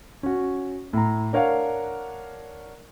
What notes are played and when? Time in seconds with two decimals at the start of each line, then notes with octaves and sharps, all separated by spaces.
0.23 C#4 F#4
0.93 A2 A#5
1.33 D4 A#4 C#5 F5 F#5